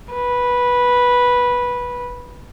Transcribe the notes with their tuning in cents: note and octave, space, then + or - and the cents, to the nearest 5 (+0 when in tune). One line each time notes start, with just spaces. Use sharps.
B4 -10